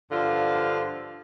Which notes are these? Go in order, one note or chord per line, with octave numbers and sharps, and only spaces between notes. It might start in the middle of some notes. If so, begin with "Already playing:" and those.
G2 D3 F3 F4